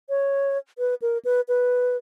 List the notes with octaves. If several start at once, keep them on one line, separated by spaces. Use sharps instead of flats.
C#5
B4
A#4
B4
B4